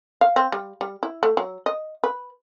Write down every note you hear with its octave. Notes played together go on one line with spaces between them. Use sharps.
F5
C4
G3
G3
E4
A3
F#3
D#5
B4